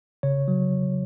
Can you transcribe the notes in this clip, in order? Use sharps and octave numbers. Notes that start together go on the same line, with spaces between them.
C#3 C#5
F#3